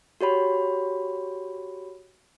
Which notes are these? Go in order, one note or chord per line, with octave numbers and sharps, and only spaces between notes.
F#4 G4 C#5 B5